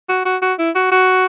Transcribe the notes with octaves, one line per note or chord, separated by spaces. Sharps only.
F#4
F#4
F#4
E4
F#4
F#4